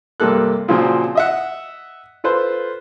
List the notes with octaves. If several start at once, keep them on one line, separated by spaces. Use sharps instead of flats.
G2 C3 A#3 A4 F#6
A#2 C#3 F3 F#3 C4
D#5 E5 F#5
F4 A4 B4 C5